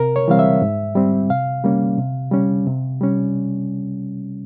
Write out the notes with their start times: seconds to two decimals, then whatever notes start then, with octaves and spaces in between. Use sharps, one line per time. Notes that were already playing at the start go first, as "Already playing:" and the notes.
Already playing: C3 A#4
0.16 C#5
0.28 E3 G3 C4 F5
0.39 E5
0.62 G#2
0.95 G3 C4
1.30 C3 F5
1.64 G3 A#3 C#4
1.98 C3
2.31 G3 C#4
2.67 C3
3.01 G3 C#4